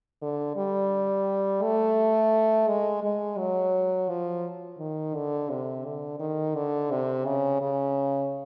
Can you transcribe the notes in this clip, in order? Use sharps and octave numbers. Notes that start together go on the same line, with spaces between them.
D3
G3
A3
G#3
G#3
F#3
F3
D#3
D3
C3
D3
D#3
D3
C3
C#3
C#3